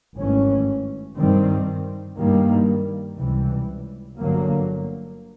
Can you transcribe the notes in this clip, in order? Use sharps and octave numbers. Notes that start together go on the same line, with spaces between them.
G#1 G2 E3 A3 C#4
G2 D#3 G3 C4
G2 D#3 G3 A#3
C#2 C3 E3 G3
G1 G2 D3 F#3 A#3